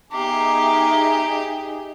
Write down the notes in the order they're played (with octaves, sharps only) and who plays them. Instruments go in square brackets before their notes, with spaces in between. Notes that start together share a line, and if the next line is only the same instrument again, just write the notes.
[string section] D#4 G#4 E5 [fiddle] G4 [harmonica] A#5 D6